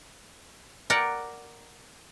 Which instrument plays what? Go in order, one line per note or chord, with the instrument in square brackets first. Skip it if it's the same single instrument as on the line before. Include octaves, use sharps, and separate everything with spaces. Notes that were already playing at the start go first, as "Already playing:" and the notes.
[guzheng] A#4 D5 F#5 G5